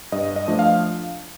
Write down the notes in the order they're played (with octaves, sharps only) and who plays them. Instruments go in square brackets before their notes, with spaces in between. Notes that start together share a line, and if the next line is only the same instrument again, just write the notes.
[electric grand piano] G2 D#5
D#5
F3 A3 D4
F5